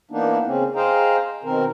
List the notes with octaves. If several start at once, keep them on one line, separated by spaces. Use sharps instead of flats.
E3 A#3 B3 D4 D#4
C#3 C4 C#4
G#4 C5 D#5 F5 G5 A#5
B2 D#3 C4 A#4